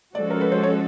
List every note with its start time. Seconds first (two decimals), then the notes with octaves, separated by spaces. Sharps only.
0.15 F3 G#3 C#4 F#4 A4 D5
0.30 A#4
0.41 B4
0.52 C5
0.63 C#5